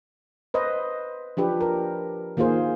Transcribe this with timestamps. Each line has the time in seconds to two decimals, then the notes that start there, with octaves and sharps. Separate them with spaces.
0.54 B4 C5 D#5
1.37 F3 D4 G4 B4
1.61 A#4
2.37 D#3 A#3 F4 G#4 C5